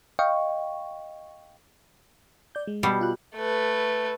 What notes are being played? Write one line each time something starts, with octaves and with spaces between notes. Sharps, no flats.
D#5 F5 G5 C#6
D5 G6
G#3
B2 G3
F4 F#6
A3 B4